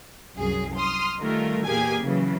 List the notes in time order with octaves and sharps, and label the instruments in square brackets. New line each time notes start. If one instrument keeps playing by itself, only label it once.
[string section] C2 F#2 G#4
C6 D#6 F6
D#3 G3 A3 F4 A#4
E2 A#2 A#3 G4 G#4 G#5
C#3 E3 F#3